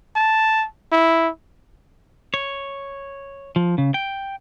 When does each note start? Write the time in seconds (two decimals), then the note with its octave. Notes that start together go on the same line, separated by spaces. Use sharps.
0.16 A5
0.92 E4
2.34 C#5
3.56 F3
3.78 C#3
3.94 G5